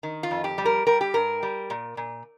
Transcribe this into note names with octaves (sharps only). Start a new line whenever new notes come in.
D#3
F4
F2
G4
G3
A#4
G3 A#4
G4
G2 A#4
G3
A#2
A#2